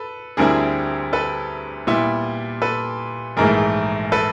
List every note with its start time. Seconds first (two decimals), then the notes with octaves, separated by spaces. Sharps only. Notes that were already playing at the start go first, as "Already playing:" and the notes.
Already playing: A4 B4
0.37 D2 D3 G3 C4 E4 G#4 A#4
1.13 A4 B4
1.87 A#2 G3 B3 E4
2.62 A4 B4
3.37 A#1 G#2 E3 A3 G#4 A#4
4.12 A4 B4